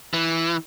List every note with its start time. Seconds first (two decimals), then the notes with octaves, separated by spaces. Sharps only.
0.14 E3